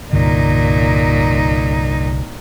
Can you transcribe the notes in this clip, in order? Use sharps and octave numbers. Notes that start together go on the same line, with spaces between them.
C2 G2 A#2 D3 D#4